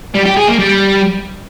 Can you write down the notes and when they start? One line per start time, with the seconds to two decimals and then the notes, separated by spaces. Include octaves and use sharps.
0.15 G3
0.26 G4
0.37 G#4
0.48 A#3
0.59 G3